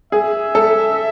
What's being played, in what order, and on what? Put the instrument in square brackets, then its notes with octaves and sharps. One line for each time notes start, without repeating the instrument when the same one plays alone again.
[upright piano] G#4 [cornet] E5
[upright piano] A4